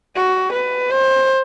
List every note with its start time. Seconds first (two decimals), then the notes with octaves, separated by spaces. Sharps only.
0.16 F#4
0.53 B4
0.91 C5